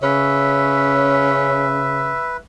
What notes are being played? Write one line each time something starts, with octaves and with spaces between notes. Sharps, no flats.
C#3 C#4 B4 E5